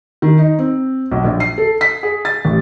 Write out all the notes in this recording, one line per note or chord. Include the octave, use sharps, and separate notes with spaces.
D#3
D#4
C4
B1
A#1
C7
A4
B6
G#4
A6
A1